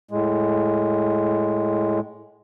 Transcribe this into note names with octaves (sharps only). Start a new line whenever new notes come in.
A2 G#3